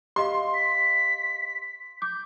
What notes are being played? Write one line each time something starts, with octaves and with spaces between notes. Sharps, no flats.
G4 D#5 F5 C6
B6
D6 G6